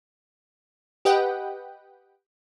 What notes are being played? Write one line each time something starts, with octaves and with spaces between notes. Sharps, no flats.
G4 B4 D#5 F#5 G5